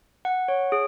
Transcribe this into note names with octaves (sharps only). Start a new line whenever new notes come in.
F#5
C#5
G#4